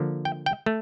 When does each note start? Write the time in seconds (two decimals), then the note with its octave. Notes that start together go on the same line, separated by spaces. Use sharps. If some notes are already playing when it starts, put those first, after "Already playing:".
Already playing: D3 F3 A#3
0.25 G5
0.46 G5
0.66 A3